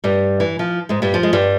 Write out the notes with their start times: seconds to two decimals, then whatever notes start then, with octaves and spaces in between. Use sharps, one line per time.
0.04 G2 G3
0.40 E3
0.59 F3
0.89 G#2 G#3
1.02 G2 G3
1.14 F3
1.23 G#3
1.33 G2 G3